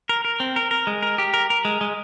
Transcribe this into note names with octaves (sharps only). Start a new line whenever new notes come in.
A#4
A#4
C4
A#4
A#4
G#3
A#4
G4
A#4
A#4
G#3
G#3